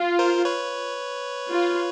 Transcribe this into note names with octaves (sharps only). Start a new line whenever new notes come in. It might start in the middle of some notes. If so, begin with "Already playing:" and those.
Already playing: F4
A#4 C5
B4 C#5
F4